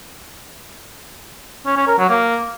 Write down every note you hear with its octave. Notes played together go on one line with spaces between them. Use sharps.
C#4
C#4
A#4
F#3
A#3